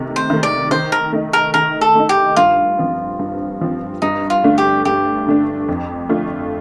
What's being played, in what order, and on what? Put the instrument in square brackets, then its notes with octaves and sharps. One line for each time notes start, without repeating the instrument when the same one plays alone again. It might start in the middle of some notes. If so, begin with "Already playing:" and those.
Already playing: [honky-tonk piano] C3 D#3 A3
[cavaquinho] C5
[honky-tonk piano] D#3 A3
[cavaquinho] D5
[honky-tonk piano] D#3 [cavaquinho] C5
[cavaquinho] A#4
[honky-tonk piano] A3 D#4
[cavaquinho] A#4
[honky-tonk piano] D#3 [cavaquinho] A#4
[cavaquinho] A4
[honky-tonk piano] A3 D#4
[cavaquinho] G4
[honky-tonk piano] G2 [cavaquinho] F4
[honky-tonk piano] F3 C4
G2
F3 C4
[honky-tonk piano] G2 [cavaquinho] D#4
[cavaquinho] F4
[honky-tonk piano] D3 A3 D4
[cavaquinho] G4
[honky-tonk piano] G2 [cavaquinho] G4
[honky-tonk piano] D3 A3 D4
F2
D3 A3 D4 F4